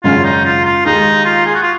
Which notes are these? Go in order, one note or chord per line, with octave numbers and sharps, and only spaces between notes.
G#1 F#2 C#3 F#3 C#4 F4
D#4
F4
F4
D#2 D#3 G#3 D#4
F4
G#4
F#4
F4